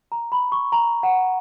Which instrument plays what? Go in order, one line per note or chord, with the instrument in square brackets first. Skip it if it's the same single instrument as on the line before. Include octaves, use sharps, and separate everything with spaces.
[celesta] A#5
B5
C#6
A#5
F#5